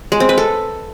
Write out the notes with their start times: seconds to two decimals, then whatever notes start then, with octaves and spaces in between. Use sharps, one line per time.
0.12 G#3
0.20 C4
0.29 B4
0.38 A4